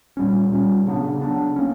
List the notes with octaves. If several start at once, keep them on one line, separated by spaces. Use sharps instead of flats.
A#2 G3 C#4
A#2 G3 C#4
C#3 F#3 B3 D4
C#3 F#3 B3 D4
A#3 C#4